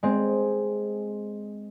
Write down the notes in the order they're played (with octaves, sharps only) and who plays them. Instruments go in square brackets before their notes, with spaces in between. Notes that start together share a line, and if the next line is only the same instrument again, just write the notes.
[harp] G#3 C4